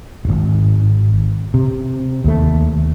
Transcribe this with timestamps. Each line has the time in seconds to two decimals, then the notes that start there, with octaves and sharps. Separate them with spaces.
0.25 D1 G#1
1.54 C3
2.24 D#2 A3